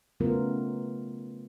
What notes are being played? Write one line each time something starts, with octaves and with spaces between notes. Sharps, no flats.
C#3 F#3 A3 B3 F4 A#4